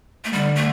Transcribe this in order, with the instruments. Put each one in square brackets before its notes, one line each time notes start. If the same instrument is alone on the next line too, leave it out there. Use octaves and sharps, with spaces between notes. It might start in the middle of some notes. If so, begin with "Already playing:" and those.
[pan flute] A3
[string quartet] D3 [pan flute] G3
[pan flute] A3